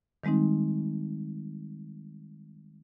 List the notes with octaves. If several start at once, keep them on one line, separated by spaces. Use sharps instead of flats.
D#3 G3 G#3 C4 D#4